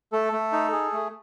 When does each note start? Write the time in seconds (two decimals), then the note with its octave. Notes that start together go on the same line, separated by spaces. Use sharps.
0.12 A3 A4
0.33 A3
0.53 D#4
0.73 G#4
0.93 A3